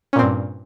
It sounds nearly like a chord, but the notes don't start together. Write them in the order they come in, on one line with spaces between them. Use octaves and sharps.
C#4 A#2 C4 G2